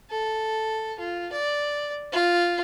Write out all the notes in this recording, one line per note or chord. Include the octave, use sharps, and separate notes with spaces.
A4
F4
D5
F4